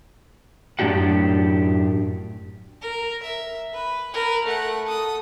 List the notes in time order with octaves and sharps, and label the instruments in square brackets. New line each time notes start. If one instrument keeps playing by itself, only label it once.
[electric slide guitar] F#2 A2 D4 G4 F#5
[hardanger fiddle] A#4
E5
B4
A#4 B4
A3 F#5
A4 D#6